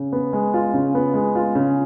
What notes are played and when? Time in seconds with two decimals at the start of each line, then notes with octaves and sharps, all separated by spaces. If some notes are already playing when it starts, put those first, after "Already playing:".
Already playing: C#3
0.12 B3
0.33 G#3
0.54 F4
0.74 C#3
0.95 B3
1.14 G#3
1.35 F4
1.55 C#3